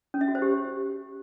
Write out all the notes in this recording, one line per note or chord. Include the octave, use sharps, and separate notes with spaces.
C#4
E5
F#4
C5
G4